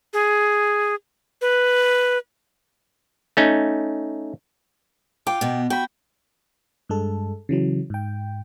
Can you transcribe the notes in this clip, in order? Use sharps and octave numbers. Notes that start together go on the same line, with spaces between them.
G#4
B4
A3 C#4 D#4
F4 G5 D6
B2 B3
F#4 G5 B5
G2 G#3 A4
C#3 E3 F#3
G#2 G5